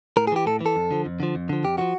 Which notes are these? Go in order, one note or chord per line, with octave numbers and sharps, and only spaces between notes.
A2 A#4
G#4
E3 G4
A2 A4
E3
A4
F2
D3 F3
F2
D3 F3
F2
D3 F3
F2 G4
D3 F3 F#4